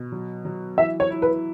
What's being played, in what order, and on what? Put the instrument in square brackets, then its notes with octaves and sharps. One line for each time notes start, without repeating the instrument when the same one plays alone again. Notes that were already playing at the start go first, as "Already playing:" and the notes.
Already playing: [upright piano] B2
F#3
F#3
[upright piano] E3 [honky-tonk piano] E5
[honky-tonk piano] C#5
[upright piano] E4
[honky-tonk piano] B4